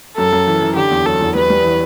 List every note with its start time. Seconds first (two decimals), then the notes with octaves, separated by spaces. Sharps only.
0.17 F#2 A4
0.32 F#2
0.47 E3
0.62 E3
0.76 D3 G4
0.91 E2
1.06 F#3 A4
1.21 E2
1.35 G3 B4
1.50 G3
1.64 E3